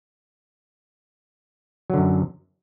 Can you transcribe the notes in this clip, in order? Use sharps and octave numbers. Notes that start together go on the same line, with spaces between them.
F#2 D3 F#3